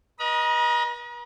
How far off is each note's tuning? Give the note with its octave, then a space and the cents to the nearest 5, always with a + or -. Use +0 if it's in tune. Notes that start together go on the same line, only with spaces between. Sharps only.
B4 -40 D#5 +0 A#5 +45